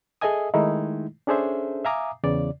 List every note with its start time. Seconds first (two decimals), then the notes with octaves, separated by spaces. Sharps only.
0.21 G#4 A4 D#5 E5 G#5 D#6
0.54 D#3 G#3 A3 D#4 E4
1.27 C#4 D4 G#4 A4 C5 E5
1.85 E5 F5 G#5 A#5 D6 D#6
2.24 E2 C#3 D5